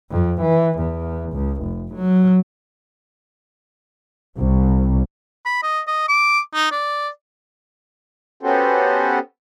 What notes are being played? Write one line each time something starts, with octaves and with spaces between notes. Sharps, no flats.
F2
E3
E2
C#2
F1
F#3
C2
B5
D#5
D#5
D6
D#4
D5
B3 C#4 F#4 G4 A4 C5